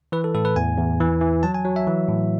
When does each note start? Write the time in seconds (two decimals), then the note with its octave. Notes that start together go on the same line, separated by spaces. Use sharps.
0.12 E3 B4
0.24 A4
0.35 A2 A4
0.45 B4
0.56 E2 G#5
0.78 E2
1.00 E3
1.21 E3
1.43 F#3 A5
1.54 G#5
1.65 F#3
1.76 E5
1.87 E3
2.08 A2